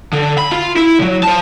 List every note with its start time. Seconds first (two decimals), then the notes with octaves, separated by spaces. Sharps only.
0.13 D3
0.38 B5
0.52 F4
0.76 E4
0.99 D#2 F#3
1.23 C5 A5